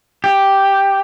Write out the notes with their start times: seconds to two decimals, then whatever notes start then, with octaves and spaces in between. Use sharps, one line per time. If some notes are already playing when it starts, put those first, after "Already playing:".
0.24 G4